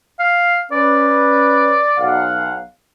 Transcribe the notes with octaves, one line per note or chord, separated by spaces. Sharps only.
F5
C#4 B4 D5
B1 F5 F#5